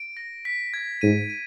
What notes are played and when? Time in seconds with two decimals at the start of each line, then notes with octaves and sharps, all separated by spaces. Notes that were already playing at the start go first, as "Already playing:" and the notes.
Already playing: D7
0.17 A#6
0.45 B6
0.74 G#6
1.01 G#2 D#7
1.30 D#7